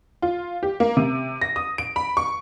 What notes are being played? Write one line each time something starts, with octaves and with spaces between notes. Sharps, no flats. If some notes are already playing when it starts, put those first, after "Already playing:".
F4
G4
A#3
C3
A#6
D#6
D7
B5
C#6